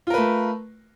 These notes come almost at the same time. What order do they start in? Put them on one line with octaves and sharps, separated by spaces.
F4 A#4 B4 A3